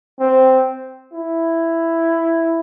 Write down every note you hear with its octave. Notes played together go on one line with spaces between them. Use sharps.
C4
E4